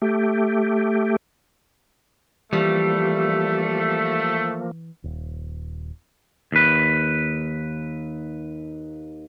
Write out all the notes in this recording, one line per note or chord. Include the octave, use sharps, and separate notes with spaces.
A3 G4
E3 F3 G3 A3 A#3
D#1
D#2 B4